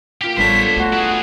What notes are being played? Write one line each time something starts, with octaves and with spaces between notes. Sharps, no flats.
A#3 F4 G4 D7
A1 G3 B3 D4 A4 C5 C#5 B6
A3 F#4
E4 G#4